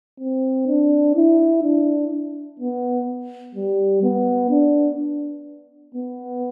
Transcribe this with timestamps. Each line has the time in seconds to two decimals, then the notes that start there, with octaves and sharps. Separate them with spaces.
0.20 C4
0.67 D4
1.15 E4
1.63 D4
2.60 B3
3.55 G3
4.03 B3
4.50 D4
5.95 B3